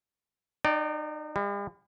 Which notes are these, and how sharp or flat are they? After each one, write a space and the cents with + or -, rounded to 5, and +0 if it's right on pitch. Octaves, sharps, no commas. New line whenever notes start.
D#4 -35 D5 +0 G5 +0
G3 +45 E5 +0